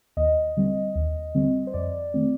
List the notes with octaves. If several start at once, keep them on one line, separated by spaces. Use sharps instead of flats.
D#2 D#5
D3 G3 C4
D#2
D3 G3 C4
C5
F2 D5
D#3 A3 C4